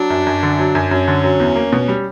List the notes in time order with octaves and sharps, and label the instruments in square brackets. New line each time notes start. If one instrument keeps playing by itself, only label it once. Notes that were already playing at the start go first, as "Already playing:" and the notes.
Already playing: [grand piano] F#3 [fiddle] D4
[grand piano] F#2
F#2
D3
F#3
F#2
[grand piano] F#2 [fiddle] C#4
[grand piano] D3
F#3
E2
A#3
B2
G3